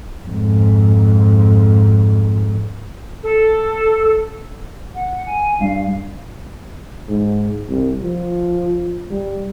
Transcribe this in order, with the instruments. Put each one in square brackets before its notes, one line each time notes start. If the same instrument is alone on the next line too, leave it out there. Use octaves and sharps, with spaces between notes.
[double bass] F2 G#2
[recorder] A4
[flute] F#5
G#5
[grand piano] G2 [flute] F5
[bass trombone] G#2
C2
F3
G3